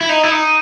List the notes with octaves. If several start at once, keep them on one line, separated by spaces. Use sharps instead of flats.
E4
D#4
E4
D#4